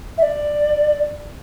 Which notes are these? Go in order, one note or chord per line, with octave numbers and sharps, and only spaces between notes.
E5
D5